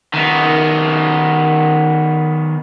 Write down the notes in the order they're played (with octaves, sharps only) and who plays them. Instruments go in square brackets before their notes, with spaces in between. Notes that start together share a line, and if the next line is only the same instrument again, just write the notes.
[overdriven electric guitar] D#3 B3